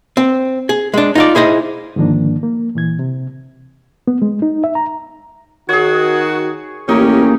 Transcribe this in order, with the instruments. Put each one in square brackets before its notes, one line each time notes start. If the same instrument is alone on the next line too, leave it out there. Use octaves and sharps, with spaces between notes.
[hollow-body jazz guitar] C4
G#4
G#3 D4
D#4 F4 D5
E4 G#4 C5 D#5
[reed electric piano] G#2 D3 D#3 F3 A#3 D4
A#3
A#2 E3 G#6
C3
B3
G#3
D#4
E5
A#5
[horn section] D#3 F#4 [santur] G#4 C#5
[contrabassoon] A1 [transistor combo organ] A#3 [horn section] C#4 G4 [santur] D#4